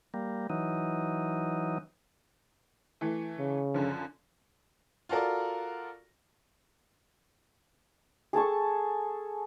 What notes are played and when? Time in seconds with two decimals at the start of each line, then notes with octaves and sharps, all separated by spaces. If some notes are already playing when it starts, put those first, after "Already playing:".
0.14 G3 A#3
0.50 E3 F#3 D#4
3.01 E3 A3
3.39 C#3
3.74 F#2 D3 F3
5.09 F4 F#4 A4 A#4 D5
8.33 G#4 A4 A5 C#6